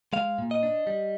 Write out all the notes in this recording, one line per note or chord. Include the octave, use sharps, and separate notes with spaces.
G#3 F5
A#2
D#5
D4
G3